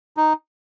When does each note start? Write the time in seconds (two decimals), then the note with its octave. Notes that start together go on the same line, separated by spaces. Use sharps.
0.17 D#4